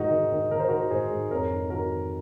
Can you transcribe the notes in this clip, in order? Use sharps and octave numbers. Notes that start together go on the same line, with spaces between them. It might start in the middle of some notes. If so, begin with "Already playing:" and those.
Already playing: G#2 D#3 D#4 F#4
D#3
D#3
D#3 A#4
C5
D#3 F#4 A#4
G#2 G#4 C5
G#2
F2 A#4 C#5
D#3
D#3 F#4 A#4